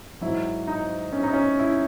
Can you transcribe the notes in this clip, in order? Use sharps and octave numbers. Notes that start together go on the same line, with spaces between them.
G#2 F#3 E4
D#4
C#4
D#4
C#4
E4